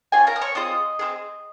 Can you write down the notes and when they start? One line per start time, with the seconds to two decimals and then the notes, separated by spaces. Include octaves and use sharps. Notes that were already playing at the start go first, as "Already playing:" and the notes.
0.12 C#4 F4 G#4 G#5
0.27 A#4 A#5
0.36 D#6
0.41 C#5 C#6
0.55 C4 F4 G#4 D#5 D#6
0.99 C4 F4 G#4